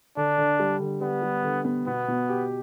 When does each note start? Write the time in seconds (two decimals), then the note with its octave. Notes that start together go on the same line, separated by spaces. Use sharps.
0.17 D3 D4
0.38 D3
0.59 G3
0.80 D3
1.01 G3 B3
1.22 G3
1.43 D3
1.65 B3
1.87 B2 B3
2.08 B2
2.29 G4